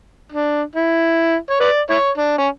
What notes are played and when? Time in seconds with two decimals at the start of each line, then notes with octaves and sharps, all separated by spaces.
0.32 D4
0.75 E4
1.50 C#5
1.60 B4 D5
1.90 E4 C#5
2.18 D4
2.38 C#4